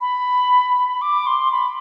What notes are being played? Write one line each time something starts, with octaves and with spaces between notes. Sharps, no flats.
B5
B5
D6
C6
B5